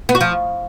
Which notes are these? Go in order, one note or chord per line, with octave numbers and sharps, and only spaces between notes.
B3
F#4
F3